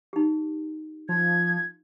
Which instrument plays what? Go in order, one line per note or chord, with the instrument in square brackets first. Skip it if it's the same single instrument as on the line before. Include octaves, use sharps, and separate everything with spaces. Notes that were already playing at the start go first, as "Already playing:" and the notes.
[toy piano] D#4 G4
[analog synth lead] F3 [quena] G#6